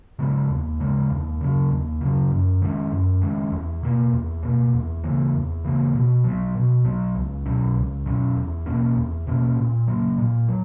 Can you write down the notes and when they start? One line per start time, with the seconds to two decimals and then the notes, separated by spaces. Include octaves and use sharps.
0.19 C#3 G#3 B3
0.50 D#2
0.80 C#3 G#3 B3
1.10 D#2
1.41 C#3 F#3
1.71 D#2
2.01 C#3 F#3
2.32 F#2
2.62 D#3 G#3 C#4
2.92 F#2
3.22 D#3 G#3 C#4
3.52 E2
3.83 B2 A#3
4.13 E2
4.43 B2 A#3
4.74 E2
5.04 C#3 E3 A#3
5.34 E2
5.64 C#3 E3 A#3
5.95 B2
6.24 F#3 B3
6.55 B2
6.85 F#3 B3
7.15 C#2
7.46 B2 F#3 C#4
7.76 C#2
8.06 B2 F#3 C#4
8.36 E2
8.66 B2 A#3 C#4
8.97 E2
9.27 B2 A#3 C#4
9.57 A#2
9.87 F#3 A#3
10.18 A#2
10.49 F#3